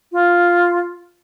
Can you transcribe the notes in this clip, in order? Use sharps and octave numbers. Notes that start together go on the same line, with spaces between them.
F4